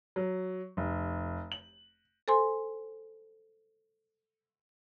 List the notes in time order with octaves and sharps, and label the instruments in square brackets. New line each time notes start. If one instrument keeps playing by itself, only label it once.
[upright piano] F#3
F1
F#7
[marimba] A4 C5 G#5 C6